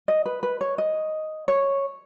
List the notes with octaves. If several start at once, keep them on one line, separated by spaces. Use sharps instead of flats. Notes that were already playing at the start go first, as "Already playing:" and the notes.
D#5
B4
B4
C#5
D#5
C#5